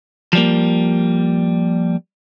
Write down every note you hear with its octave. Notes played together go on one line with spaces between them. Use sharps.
F3 G3 A#3